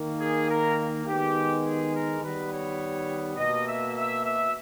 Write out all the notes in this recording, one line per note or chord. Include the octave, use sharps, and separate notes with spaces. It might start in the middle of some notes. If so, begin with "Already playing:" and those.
Already playing: D#3 A#3
G#4
A#4
D#3 G#3 B3 G4
G#4
A#4
D#3 G3 B3 B4
C#5
B2 A#3 D#5
E5
E5
E5